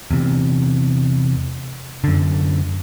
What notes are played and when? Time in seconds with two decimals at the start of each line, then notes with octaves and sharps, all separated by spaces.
0.11 E2 C3
2.04 F#2 D3